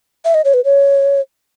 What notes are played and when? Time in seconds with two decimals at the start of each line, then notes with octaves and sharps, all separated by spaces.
0.25 E5
0.34 D#5
0.45 C#5
0.54 B4
0.65 C#5